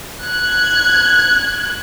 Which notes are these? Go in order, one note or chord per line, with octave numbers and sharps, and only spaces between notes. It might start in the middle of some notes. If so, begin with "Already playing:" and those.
F#6 G#6